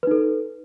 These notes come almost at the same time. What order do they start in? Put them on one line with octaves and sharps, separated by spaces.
B4 D#4 A4